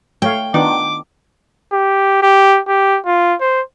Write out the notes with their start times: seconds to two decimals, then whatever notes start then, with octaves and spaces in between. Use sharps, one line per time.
0.22 A3 C#5 F5 G5
0.54 D#3 B3 D4 F4 D6
1.73 G4
2.23 G4
2.68 G4
3.06 F4
3.41 C5